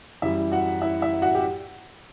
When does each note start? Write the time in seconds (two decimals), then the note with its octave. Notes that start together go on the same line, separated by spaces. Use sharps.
0.22 F#2 E3 G3 E4 E5
0.52 F#4 F#5
0.82 E4 E5
1.02 E4 E5
1.22 F#4 F#5
1.35 G4